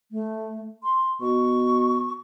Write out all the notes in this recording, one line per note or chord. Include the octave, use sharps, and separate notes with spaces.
A3
C6
B2 C#6